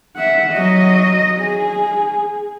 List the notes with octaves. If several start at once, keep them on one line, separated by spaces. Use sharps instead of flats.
E5 F#5
F#3 D#5
G#4